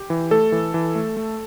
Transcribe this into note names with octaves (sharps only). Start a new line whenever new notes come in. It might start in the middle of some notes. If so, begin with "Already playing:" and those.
Already playing: G4
E3
A3 A4
E3
E3
A3
A3